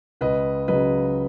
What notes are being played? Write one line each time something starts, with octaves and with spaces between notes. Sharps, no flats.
C#2 B4 D#5
C#3 F#3 B4 D#5